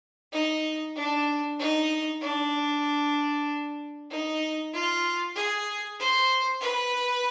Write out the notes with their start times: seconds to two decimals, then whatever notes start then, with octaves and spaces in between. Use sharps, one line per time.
0.32 D#4
0.96 D4
1.59 D#4
2.21 D4
4.10 D#4
4.73 F4
5.35 G#4
5.99 C5
6.61 B4